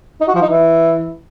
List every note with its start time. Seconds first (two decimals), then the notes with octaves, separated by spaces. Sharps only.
0.21 D#4
0.28 F#4
0.35 F3
0.42 D#4
0.49 E3